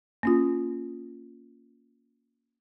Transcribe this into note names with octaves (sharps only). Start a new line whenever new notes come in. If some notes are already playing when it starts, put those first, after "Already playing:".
A#3 C#4 F4